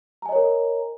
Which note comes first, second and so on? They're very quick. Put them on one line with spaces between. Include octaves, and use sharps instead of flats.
A#5 G#5 D#5 C#5 A#4